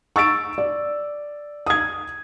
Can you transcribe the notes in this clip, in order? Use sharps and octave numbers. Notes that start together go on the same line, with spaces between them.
C#6 E6 A6 D7
D5
D#6 G#6